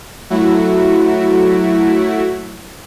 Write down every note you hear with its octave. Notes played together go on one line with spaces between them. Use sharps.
F#3 A3 E4 F#4